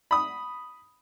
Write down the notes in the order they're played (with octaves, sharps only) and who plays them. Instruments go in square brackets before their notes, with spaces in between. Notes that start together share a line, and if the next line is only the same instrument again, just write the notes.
[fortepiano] B5 D#6